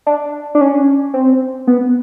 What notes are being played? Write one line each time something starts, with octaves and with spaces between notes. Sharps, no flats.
D4
D4
C#4
C4
B3